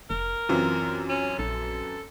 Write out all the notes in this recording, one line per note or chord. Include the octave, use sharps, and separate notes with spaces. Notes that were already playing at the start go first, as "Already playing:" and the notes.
F1 A#4
F#2 E3 C4 F4
C#4
A#1 A4